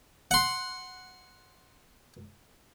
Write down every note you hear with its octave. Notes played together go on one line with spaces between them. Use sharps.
F#5 C6